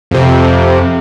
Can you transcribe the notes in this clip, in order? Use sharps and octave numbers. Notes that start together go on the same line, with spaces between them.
F2 C3